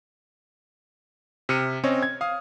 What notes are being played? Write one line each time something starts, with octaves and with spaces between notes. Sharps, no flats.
C3 F6 C#7 D#7
C4 C#4 C#5 D#5
G#6
F5 D#6